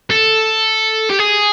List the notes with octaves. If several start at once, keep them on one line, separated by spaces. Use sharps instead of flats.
A4
G4
G#4